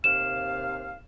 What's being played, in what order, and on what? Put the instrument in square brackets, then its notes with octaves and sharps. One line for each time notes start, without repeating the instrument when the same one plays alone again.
[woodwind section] D#2 C3 F5 [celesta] E7